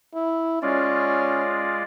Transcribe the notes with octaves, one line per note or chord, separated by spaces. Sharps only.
E4
G#3 C#4 F4 D5